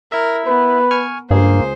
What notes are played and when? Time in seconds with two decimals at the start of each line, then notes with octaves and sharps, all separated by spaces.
0.12 E4 A#4 E5
0.47 B3 B4
0.91 G#5 C#6 F6
1.31 C#2 G2 A#3 G#4 C5